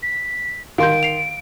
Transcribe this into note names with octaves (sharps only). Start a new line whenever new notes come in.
B6
D#3 F5 C6 G6 D7
C7 F7